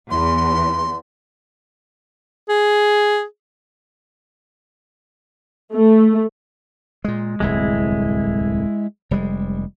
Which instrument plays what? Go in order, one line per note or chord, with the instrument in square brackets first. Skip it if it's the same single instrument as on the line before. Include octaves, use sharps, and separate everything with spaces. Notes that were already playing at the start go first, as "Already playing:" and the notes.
[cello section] E2 [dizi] C6
[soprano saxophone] G#4
[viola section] A3
[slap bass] A#2 G#3
[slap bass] D1 C2 F2 [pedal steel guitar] G#3 E4
[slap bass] F1 G3 G#3